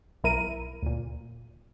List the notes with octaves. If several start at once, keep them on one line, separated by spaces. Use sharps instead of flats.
B1 E4 A#4 D#7
D2 A#2